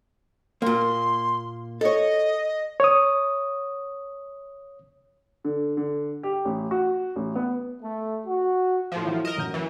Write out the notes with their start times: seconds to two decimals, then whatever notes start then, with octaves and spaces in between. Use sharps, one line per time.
0.62 A#2 A#3 C6
1.81 A4 C#5 D#5
2.80 C#5 D#6
5.44 D3
5.77 D3
6.23 G4
6.45 A1
6.71 F#4
7.16 A1
7.35 B3
7.81 A3
8.26 F#4
8.92 A2 F3
9.03 E3 F#3 E4
9.25 A#4 D#5 E7
9.37 A1 F#2 G6
9.54 E3